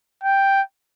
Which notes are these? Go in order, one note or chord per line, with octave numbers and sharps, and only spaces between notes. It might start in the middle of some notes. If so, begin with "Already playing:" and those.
G5